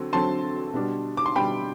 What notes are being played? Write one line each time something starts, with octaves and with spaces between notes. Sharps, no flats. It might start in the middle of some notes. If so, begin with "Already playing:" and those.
Already playing: D3 F#3 C4
D3 F#3 C4 A5 C6
B2 G3 D4
D6
C6
B2 G3 D4 G5 B5